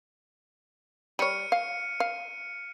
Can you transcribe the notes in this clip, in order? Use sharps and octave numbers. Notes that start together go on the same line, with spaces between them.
G3 C#5 F6 C#7 D#7
F5
F5